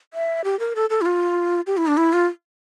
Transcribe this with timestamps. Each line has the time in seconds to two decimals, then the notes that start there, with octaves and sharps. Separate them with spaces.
0.14 E5
0.44 G4
0.59 A#4
0.75 A4
0.90 A4
1.01 E4
1.06 F4
1.67 G4
1.77 E4
1.87 D4
1.97 E4
2.13 F4